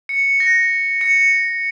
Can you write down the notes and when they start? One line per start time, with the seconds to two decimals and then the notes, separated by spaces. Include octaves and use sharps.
0.09 C#7
0.40 A#6
1.01 C#7